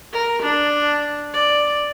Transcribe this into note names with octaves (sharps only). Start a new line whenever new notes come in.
A#4
D4
D5